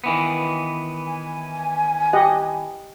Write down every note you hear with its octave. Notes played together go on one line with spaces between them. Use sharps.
D#3 E3 B3
G#5
G4 D#5 F#5